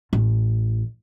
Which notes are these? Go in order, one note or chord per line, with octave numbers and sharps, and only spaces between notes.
A1